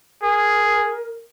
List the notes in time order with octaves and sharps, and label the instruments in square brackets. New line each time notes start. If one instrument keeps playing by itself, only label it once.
[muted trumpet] G#4 [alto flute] A#4